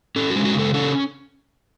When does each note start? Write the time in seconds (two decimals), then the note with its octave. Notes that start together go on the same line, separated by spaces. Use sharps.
0.16 C#4 A4
0.30 F#4
0.36 G#3
0.45 F#4
0.54 C#3 A4
0.74 C#4 A4